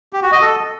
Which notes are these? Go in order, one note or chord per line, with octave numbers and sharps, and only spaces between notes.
G4
F#4
D#5
A4